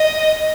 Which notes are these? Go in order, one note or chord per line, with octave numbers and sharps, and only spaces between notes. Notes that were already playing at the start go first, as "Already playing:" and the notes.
Already playing: D#5